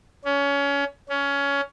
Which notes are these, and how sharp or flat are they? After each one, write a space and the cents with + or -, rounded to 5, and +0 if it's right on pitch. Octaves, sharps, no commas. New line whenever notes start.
C#4 +25
C#4 +20